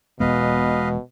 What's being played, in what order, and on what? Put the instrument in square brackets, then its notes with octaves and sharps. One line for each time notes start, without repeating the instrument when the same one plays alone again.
[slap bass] E1 G#3 B3 [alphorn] B2 [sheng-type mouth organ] B4 D#5 F5